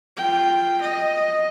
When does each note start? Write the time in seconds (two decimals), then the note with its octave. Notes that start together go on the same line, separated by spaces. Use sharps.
0.17 F4 G5
0.81 D#5